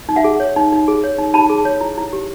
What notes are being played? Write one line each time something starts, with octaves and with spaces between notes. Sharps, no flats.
D#4
E5 F#5
G#4
C#5
D#4
D#4
G#4
C#5
D#4
D#4 A5 B5
G#4
C#5
E4
E4
G4